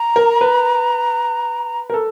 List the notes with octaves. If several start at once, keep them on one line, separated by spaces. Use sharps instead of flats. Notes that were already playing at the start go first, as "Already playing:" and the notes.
Already playing: A#5
A#4
B4
A#4
A4